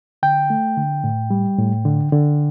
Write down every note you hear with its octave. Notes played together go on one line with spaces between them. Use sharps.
D3 G5
A3
D3
A2
G3
A2
D3
D3